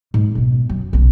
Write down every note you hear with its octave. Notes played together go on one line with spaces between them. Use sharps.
G#2
B2 B3
F#2
B1 C#3